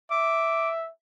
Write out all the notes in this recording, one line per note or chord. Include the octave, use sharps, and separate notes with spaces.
E5 D6